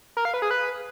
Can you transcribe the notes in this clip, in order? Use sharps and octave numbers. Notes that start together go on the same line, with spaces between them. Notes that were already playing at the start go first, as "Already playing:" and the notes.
A#4
F5
B4
G#4
B4